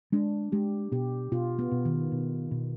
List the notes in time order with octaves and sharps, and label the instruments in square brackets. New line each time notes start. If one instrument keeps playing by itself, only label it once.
[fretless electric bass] G#3 [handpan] D4
[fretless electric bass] G#3 [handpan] G4
[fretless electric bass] B2 [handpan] G4
[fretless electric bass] B2 [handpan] F4
[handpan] B3
[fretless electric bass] B2
[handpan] D#3
[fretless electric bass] B2
B2